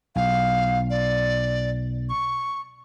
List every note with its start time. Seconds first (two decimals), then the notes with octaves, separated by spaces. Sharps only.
0.16 B1 F5
0.90 D5
2.10 C#6